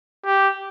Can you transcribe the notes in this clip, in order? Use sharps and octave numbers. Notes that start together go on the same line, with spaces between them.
G4